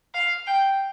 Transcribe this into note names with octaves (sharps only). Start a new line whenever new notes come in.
F5
G5